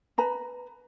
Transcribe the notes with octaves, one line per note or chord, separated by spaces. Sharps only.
B4 A#5 B5